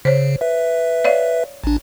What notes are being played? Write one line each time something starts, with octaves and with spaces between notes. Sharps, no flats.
C#3 C5 C#5
B4 E5
C#5 D5 F5
A1 D4